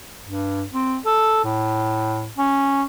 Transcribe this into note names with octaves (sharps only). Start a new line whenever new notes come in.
G2
C4
A4
A2
C#4